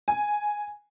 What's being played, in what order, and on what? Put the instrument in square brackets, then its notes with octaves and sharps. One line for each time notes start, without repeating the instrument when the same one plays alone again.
[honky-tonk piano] G#5